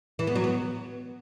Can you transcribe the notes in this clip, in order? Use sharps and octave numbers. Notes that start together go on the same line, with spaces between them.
E3
B3
F#3
B3